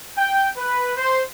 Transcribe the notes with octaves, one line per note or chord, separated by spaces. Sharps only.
G5
B4
C5